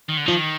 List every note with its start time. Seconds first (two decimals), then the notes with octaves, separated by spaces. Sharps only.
0.09 D#3
0.17 D3
0.26 D#3 F3